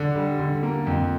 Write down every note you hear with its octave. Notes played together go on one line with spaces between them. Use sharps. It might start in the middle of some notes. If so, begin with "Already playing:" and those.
Already playing: D3
G3
D3
A#3
F2